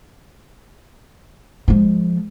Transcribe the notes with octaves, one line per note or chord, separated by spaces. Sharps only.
F3 G#3